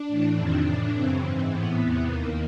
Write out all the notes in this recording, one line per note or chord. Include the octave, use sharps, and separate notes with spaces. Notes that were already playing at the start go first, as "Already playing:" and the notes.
Already playing: D4
A2 E3
F2 C3 D#3
A2 E3
F#2 C#3 E3 C4
G#2 E3
A2 E3 B3
E2 C3 E3
D#2 D#3 A#3